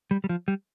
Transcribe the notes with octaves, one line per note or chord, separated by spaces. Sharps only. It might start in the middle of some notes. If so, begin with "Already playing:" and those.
G3
G3
F3
G3